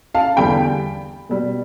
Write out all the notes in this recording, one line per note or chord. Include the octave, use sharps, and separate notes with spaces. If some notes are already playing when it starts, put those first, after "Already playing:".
F5 A5
E2 D3 G3 G5 B5
B2 G3